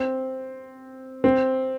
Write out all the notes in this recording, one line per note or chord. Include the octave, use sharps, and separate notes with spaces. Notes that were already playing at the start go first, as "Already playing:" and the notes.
Already playing: C4
C4